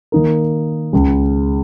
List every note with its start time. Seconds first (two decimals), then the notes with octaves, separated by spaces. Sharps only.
0.12 D#3 A#3 D#4 A#4
0.93 C#2 C#3 G#3